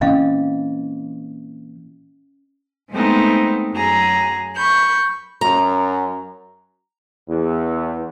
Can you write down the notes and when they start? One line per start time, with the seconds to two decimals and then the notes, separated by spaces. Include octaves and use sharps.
0.01 A#2 E3 C4 C#4 D#5 F5
2.91 G#3 A3 B3 C4 D#4
3.72 F#2 F#3 G#4 A#5
4.56 B5 C#6 G6
5.41 F#2 A#5
7.29 E2